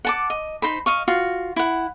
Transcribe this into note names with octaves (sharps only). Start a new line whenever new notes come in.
F#5 A5 D6
D#5
D#4 C5 B5
D#5 F5 C#6
F4 F#4
E4 F#5